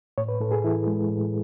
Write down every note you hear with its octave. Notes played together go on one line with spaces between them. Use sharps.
A2 C#5
B4
A2 A4
G#4
E3 E4
G#3
A2